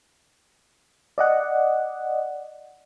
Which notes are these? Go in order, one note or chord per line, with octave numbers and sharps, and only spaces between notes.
D5 D#5 F#5